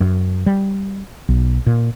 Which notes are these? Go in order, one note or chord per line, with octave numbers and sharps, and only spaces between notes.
F#2
G3
B1
A#2